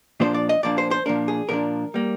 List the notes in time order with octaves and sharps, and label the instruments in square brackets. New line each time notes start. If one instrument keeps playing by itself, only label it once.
[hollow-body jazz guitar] A#2 F3 A#3 D4 C5
D5
D#5
A#2 F3 A#3 D4 D5
C5
C5
A#2 F3 A#3 D4 A#4
G#4
A#2 F3 A#3 D4 A#4
G3 A#3